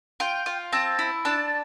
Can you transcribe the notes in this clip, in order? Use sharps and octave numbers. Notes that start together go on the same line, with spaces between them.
F4 G5
F4
C4 A5
E4
D4 A5